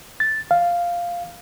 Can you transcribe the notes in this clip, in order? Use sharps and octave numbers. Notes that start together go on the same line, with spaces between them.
A6
F5